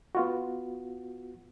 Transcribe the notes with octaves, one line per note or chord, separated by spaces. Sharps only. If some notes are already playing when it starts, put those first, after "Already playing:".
B3 F4 F#4